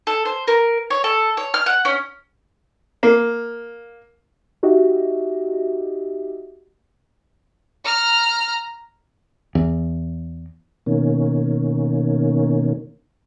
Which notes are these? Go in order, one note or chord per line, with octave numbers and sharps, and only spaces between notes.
A4
C5
A#4
C#5
A4
C#5
F6
F#5
C#4
A#3
D#4 F#4 G4 D#5 E5
A#5 F6
E2
B2 D#3 A#3 C#4